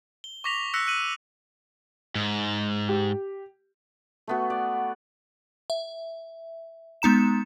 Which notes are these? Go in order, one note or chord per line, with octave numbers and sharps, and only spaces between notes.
G7
C#6 D6 A#6 B6 F7
E6 F#6 A#6 B6 C#7
E6 F#6 D#7 F#7
G#2
G4
A3 B3 F#4
D5
E5
G#3 B3 D#4 A#5 E7